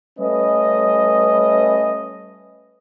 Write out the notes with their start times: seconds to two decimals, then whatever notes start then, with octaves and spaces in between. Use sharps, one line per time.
0.19 G3 A3 C#4 B4 D#5